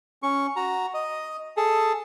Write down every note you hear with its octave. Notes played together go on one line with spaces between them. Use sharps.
C#4 C#6
F#4 A#5
D#5
G#4 A4